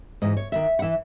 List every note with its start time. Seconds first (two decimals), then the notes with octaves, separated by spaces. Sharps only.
0.22 G#2 E3 D#5
0.37 C#5
0.52 D#2 E5
0.55 D#3
0.79 F#5
0.82 E3 E5